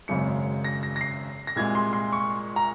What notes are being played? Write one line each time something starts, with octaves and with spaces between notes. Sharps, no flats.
G#1 F#2 C#3 G#3 C#7
A#6
A#6
A#6
C7
A#6
C2 A#2 G#3 G#6
C6
C6
C#6
A#5